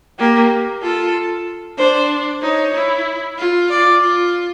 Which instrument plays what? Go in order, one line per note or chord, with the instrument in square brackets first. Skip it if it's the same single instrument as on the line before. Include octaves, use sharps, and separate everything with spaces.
[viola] A#3 [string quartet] G4
[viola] F4 [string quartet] A4
[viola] D4 [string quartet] C5
[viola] D#4 [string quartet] C#5
[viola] E4
F4
[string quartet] D5
[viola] F4